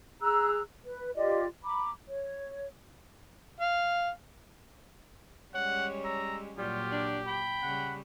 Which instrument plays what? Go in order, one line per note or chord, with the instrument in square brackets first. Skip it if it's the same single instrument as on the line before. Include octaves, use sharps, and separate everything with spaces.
[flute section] G#4 A#5 E6 F#6
B4
F4 G4 D5 D#5
A#5 B5 D6
C#5
[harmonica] F5
[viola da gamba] G3 G#3 C#4 [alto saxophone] C#5 [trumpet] F#5
[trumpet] A#5 [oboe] E6
[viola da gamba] A#2 F#3 [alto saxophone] G3 [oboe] F4 [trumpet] G4
[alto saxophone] D4
[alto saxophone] G5 [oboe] B5
[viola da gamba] C#3 G3 [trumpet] F#5